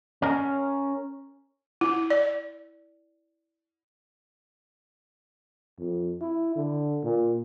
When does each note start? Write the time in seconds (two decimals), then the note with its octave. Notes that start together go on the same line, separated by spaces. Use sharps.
0.22 C#4 A#4
1.81 E4
2.10 D5
5.78 F2
6.21 E4
6.56 D3
7.03 A#2